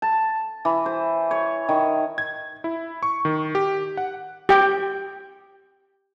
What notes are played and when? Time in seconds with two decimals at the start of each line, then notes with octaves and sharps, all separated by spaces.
0.02 A5
0.65 E3
0.86 C5
1.31 C#5
1.69 D#3
2.18 G#6
2.64 E4
3.03 C#6
3.25 D#3
3.55 G4
3.97 F#5
4.49 G4 G5